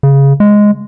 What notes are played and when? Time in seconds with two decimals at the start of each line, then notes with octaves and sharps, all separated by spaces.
0.03 C#3
0.40 G#3